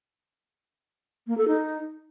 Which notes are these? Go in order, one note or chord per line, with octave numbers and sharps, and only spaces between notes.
A#3
A4
D#4